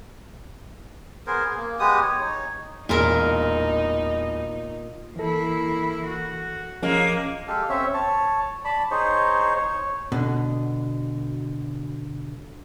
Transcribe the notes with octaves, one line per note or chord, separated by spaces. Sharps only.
B3 G#4 A#4 C5
G#4
A#3
G#3 B3 G4 D#6
C#5
D#4 C#5
E1 A#2 D#4 A#4
E3 A#3 E4 A4
F#4
F3 G#3 A#3 C#4
G#3 G4 A4 F5
C4 C#4 C#5 E5
C#5 A5
D5 A5 B5
D#4 G#4 C5 C#5
C#5
B2 D3